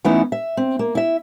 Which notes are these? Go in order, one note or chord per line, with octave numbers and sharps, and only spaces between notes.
E3 A3 B3 C#4 D#4 E4
E5
C4
A#3
E4 E5